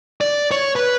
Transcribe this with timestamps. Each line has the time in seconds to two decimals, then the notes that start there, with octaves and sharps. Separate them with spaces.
0.21 D5
0.51 C#5
0.76 B4